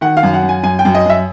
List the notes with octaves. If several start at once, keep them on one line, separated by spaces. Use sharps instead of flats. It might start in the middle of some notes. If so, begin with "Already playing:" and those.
D#3 F#5
F5
F#2
F#5
F#2
G#5
F#2 G#5
G5
F#2
D#5
F#2 E5